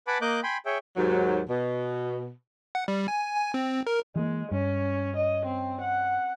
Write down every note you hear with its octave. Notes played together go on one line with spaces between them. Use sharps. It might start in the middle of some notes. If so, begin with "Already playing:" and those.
B4 F#5 G#5 A5 B5 D6
A#3 D#5 D6 F#6 G6
G5 G#5 B5 C6
G#4 C#5 E5 G5
D#2 G#2 F#3
B2
F#5
G3
G#5
G#5
C4
A#4
E3 G#3 A#3
G2 C#4
D#5
C4
F#5